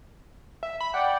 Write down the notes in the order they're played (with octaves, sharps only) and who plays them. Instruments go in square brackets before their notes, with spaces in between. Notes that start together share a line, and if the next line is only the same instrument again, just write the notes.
[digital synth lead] E5
B5
[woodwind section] D5 G5 [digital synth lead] F#5